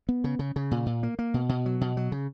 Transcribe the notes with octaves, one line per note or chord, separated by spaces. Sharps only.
B3
C#3
C#3
C#3
A#2
A#2
A#3
A#3
B2
B2
F#3
B2
F#3
C#3